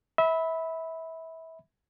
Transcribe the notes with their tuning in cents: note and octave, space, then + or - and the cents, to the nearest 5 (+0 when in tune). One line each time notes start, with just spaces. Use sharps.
E5 -25 B5 +0